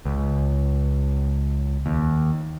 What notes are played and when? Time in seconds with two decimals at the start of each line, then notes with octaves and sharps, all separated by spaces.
0.05 C#2
1.86 D#2